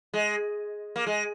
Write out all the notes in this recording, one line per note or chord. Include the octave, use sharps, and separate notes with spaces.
G#3
A#3
G#3